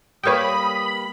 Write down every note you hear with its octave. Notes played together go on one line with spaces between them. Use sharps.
G3 A#3 B4 C#5 G5 B5 D#6